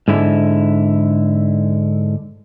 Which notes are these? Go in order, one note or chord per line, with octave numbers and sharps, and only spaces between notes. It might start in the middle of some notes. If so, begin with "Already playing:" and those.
G#2 D3 E4